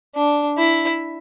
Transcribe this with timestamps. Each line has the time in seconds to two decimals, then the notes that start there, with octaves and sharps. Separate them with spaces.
0.15 D4
0.58 E4